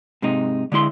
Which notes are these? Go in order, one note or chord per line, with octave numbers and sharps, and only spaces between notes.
G#2 C3 D#4
D3 G#3 E4 C6